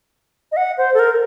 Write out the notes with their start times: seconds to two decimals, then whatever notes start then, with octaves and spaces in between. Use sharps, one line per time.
0.52 D#5
0.57 F#5
0.78 C5
0.94 A4
0.99 A#4